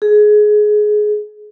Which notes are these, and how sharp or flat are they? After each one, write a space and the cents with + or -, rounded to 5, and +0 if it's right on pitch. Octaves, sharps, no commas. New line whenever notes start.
G#4 +20